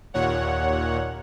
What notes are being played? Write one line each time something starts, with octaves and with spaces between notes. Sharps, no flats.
D#2 A#2 C#5 F#5